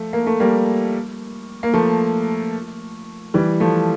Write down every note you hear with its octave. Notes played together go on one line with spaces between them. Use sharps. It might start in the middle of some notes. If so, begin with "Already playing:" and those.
Already playing: F3 A3
A#3
A3
G3 A#3
A#3
F3 A3
E3 G3
F3 A3